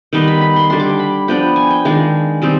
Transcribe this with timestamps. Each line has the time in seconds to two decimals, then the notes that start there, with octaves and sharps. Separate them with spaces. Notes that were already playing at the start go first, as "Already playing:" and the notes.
0.13 D#3 G3 B3 D#4 C6
0.28 B5
0.41 B5
0.56 C6
0.70 D3 G3 D4 C6
0.79 D6
0.89 C6
0.99 B5
1.28 F3 B3 D4 G5
1.56 G#5
1.70 G5
1.85 D#3 G#3 D4 F5
2.42 D#3 G3 C4 D#4